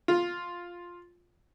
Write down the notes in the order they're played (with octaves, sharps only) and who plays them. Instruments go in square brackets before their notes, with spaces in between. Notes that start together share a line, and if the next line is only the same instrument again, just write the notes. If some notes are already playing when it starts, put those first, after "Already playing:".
[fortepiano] F4